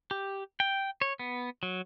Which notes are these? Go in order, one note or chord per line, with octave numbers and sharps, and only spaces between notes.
G4
G5
C#5
B3
F#3